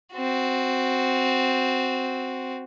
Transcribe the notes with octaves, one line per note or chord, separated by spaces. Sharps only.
C4 F#4